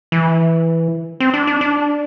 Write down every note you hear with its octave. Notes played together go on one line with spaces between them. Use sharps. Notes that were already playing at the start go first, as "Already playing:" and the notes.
E3
C4
D4
D4
D4